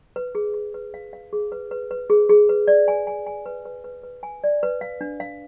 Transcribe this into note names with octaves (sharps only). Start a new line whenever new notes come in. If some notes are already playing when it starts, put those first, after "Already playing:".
B4
G#4
G#4
B4
F5
F5
G#4
B4
B4
B4
G#4
G#4
B4
D5
G#5
G#5
G#5
B4
B4
B4
B4
G#5
D5
B4
F5
D4
F5